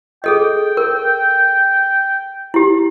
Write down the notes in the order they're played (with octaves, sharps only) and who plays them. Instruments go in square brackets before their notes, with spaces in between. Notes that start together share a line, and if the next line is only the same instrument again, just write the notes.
[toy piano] G#4 A4 D#5 [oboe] G5
[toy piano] A#4
E4 G4